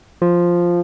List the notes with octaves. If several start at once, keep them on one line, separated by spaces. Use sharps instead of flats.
F3